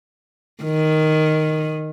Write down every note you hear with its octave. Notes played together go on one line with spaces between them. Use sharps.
D#3